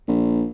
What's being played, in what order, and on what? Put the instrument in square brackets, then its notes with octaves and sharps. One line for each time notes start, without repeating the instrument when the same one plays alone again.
[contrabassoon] A#1